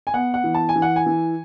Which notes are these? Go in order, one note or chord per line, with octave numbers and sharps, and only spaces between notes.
G#5
B3 F#5
F#5
E3
A5
G#5
E3
F#5
G#5
E3